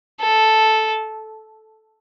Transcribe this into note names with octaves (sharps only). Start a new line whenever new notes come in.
A4